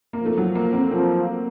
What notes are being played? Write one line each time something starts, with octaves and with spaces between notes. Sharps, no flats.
A#3
F3
A3
F#3
A#3
C4
F3 C4